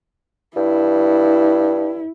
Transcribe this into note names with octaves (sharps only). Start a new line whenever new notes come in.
G2 E4